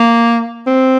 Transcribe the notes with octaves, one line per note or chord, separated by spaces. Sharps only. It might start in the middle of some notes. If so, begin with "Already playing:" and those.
Already playing: A#3
C4